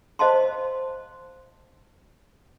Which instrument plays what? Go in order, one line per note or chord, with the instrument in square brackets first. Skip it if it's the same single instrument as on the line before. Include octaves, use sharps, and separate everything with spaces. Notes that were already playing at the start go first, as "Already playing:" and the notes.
[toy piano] C5 D#5 F5 A5 C6